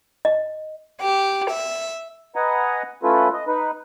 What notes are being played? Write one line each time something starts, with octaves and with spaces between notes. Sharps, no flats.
D#5
G4
E5
B4 D#5 F#5 G#5 A#5
A3 C#4 E4 F4 A4 B4
D#5
D#4 B4